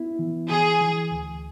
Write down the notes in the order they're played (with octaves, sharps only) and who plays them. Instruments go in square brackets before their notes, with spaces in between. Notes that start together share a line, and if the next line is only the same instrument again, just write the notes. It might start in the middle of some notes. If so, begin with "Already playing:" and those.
Already playing: [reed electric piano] B3 E4
E3
[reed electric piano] E3 [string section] G#4
[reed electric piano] E3
D2